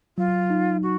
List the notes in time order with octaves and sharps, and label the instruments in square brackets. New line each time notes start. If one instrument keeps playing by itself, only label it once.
[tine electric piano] F#3 [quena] F4
[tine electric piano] D#4
[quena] F#4